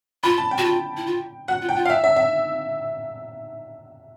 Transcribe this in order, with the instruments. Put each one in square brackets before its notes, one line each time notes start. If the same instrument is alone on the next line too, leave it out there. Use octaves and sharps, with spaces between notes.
[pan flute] F4 [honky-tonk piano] B5
[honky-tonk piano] A5
G5
[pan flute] F#4
F4
E4
F4
[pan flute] F#4 [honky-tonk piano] F#5
[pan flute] F4
[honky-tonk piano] G5
[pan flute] F4
[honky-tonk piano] F5
E5
E5
E5